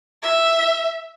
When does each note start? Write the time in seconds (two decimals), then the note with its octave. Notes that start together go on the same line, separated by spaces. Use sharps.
0.23 E5